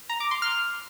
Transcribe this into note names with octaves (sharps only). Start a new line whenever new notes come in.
A#5
D6
C6
F6